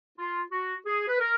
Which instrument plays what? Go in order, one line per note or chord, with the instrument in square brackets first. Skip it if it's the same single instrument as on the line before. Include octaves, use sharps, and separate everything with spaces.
[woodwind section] F4
F#4
G#4
B4
A#4